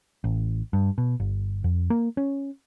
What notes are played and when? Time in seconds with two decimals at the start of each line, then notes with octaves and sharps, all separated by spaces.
0.24 A1
0.73 G2
0.98 B2
1.20 G1
1.64 F2
1.90 A#3
2.17 C#4